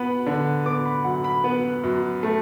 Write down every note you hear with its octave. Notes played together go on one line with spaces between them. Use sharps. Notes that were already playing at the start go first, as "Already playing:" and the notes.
Already playing: B3 B5
D3
B3 D6
B5
F#2 F#5
B5
B3
F#2
A3